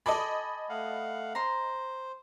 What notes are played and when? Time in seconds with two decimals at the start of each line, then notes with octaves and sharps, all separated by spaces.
0.06 A4 D5 D#5 G#5 B5
0.69 A3 F5 F#5
1.35 C5 A#5 C6